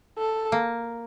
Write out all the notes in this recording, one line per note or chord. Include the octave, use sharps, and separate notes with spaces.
A4
A#3